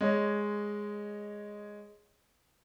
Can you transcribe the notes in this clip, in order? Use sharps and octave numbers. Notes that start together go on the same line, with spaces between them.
G#3 C#5 D#5